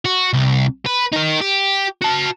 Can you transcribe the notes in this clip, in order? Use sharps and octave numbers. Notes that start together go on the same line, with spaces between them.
F#4
C2
B4
D#4 A#4
G4
F#4 A5